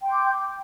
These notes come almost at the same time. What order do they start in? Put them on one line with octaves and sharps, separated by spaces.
G5 C6 G6 D6